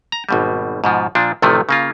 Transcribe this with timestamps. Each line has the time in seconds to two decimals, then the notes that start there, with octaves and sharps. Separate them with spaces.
0.12 A#5
0.29 G#1 B2 G3
0.84 G#2 B2 F3
1.15 A#2 F3 D4
1.42 A1 C3 D#3 F3 A3
1.69 C#3 A#3 F4